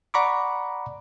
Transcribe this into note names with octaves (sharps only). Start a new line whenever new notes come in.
D5 F#5 A#5 B5 C#6 D6